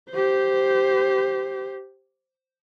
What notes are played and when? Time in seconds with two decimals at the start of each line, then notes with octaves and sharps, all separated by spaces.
0.10 G4 C5